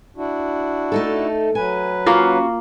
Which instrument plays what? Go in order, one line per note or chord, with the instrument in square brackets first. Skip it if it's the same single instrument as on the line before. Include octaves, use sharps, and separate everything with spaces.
[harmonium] D4 E4 F#4
[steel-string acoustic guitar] A3 D#4 A4
[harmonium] F#3 B4 [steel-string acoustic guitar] G#5
[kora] A#3 F4 [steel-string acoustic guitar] C#4 F#4